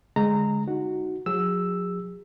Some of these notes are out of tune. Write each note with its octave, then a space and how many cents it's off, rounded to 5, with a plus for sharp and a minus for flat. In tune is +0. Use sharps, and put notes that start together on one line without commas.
D3 -15 G#3 +0 A#5 -15
D#4 +0 F#4 +0
F#3 -40 G#4 -40 E6 +0